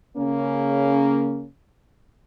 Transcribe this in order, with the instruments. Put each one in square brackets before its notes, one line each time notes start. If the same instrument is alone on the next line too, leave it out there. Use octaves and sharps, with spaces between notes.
[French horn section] C#3 A#3 C#4